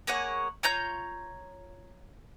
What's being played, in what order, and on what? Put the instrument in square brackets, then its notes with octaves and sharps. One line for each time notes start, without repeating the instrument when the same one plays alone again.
[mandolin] A#3 G#4 C#5 F#5
F4 C#5 A#5 G6